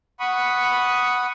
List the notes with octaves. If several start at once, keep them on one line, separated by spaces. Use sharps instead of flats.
F#5 B5 C#6 D#6